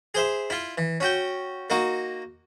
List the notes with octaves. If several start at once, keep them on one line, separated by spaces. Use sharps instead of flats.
G#4 C5 E5
E4 F4
E3
C#4 F#4 G5
A#3 D#4 F#4